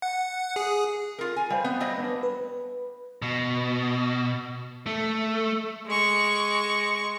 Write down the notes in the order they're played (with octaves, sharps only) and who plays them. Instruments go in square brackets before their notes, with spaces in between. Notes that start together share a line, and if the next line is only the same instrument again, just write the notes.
[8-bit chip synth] F#5
G#4
[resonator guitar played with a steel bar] F4 A#4
G#5
[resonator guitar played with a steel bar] G3 [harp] C5 F5 G5
[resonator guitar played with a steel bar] B3
F#3 G3 D#5
[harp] B3 D4
[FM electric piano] B4
[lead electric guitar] B2
A3
[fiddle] G#3 C#6